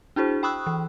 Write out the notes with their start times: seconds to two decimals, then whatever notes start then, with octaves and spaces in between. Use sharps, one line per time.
0.16 D4 E4 F#4 G#4 C5
0.43 G5 B5 C#6 D#6 E6 F#6
0.67 E3